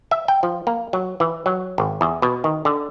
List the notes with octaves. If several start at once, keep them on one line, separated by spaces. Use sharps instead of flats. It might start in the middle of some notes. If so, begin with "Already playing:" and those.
E5
G5
F3
A#3
F#3
E3
F#3
G#1
E2
B2
D#3
D3